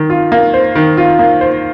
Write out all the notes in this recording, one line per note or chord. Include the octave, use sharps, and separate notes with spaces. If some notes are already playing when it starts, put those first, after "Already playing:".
Already playing: D#3
F4
A#3
C5
D#3
F4
A#3
C5